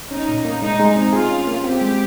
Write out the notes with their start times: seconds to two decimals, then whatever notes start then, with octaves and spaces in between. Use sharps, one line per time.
0.11 C#4 D#4
0.28 A#2
0.45 A#3
0.62 G#3 D#4
0.80 G#3
0.96 C4
1.13 F4 G#4
1.30 C#4
1.47 A#3
1.64 C4 G4
1.81 G#3